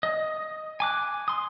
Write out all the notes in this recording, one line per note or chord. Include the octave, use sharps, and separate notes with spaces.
D#5
G#5 D6 F#6
C6 D#6